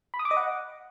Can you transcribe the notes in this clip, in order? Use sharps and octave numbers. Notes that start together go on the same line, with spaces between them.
B5
D#6
D6
D#5
F#5